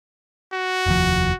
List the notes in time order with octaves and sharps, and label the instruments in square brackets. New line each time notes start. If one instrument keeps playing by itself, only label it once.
[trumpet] F#4
[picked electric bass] F1 D#2 F3